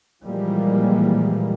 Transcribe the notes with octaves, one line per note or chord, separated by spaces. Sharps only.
A#2 E3 F3 G3 G#3 A#3